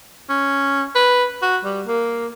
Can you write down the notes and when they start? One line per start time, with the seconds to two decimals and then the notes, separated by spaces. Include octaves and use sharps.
0.29 C#4
0.96 B4
1.42 F#4
1.65 G3
1.87 A#3